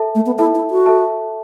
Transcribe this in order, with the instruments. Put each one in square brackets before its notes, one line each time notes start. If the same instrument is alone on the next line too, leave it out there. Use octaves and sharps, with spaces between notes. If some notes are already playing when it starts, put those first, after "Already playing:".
Already playing: [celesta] A4 E5 A5
[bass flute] A3
B3
[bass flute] E4 [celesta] A4 E5 A5
[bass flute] E4
F#4
[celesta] A4 E5 A5